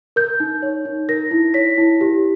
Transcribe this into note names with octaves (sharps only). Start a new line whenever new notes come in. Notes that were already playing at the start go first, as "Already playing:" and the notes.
A#4 G6
D#4
C#5
D#4
A#4 A#6
E4
C#5 B6
E4
G4